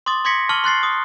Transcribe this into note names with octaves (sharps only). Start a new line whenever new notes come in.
C6 D6 D#6 A6
C6 D6 G#6 A#6 B6 C#7
A5 C#6 D6 F6 F#7 G7
C6 F#6 A6 C7
D#6